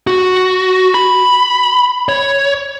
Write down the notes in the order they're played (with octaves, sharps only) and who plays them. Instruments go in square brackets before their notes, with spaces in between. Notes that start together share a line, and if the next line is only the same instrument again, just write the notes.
[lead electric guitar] F#4
B5
C#5